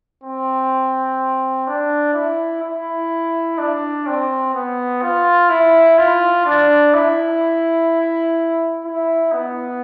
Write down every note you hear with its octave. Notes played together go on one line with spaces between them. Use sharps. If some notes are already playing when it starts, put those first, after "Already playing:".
C4
D4
E4
E4
D4
C4
B3
F4
E4
F4
D4
E4
E4
B3